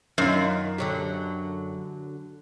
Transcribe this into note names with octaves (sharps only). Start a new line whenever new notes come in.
F#2 D#3 F4
D3 F#3 G4